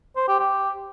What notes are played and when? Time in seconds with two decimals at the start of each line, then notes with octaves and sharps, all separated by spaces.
0.16 C5
0.28 G4
0.39 G4